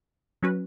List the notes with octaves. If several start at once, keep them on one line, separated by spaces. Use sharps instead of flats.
F#3 C#4 F#4 B4